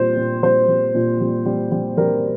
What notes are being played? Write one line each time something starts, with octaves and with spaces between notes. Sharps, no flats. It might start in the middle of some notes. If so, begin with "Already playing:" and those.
Already playing: A#2 G3 C5
A#2
G3 C5
G3
A#2
G3
G3
G3
G3 A#4